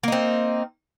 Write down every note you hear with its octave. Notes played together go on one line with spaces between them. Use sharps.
A#3 C4 D#4